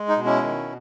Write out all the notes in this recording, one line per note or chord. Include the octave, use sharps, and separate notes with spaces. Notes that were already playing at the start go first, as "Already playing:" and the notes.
Already playing: G#3
D#4
B2
C#4 E4
D#3